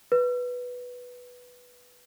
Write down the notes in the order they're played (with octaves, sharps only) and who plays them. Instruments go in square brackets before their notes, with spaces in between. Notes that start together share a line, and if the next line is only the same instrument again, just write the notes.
[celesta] B4